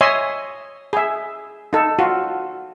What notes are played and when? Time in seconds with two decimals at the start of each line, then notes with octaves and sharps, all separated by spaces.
0.01 C#5 D#5 E5 G#5 C6
0.93 G#4 E5
1.73 D#4 A4
1.99 F4 F#4